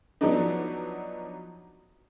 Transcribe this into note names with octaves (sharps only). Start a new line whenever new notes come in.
F3 F#3 B3 D4 D#4